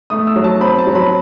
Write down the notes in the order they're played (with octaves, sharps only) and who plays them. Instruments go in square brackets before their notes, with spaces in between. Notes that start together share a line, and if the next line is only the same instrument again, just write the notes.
[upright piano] A3 D#6
E6
F#3
A5
C4 B5
A5
F#3
B5